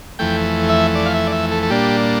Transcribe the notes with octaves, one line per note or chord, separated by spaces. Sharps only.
F2 E3 A3 G5
E5
D5
F5
E5
D5
E5
A4
A4
A#2 G3 A#3 D4 G4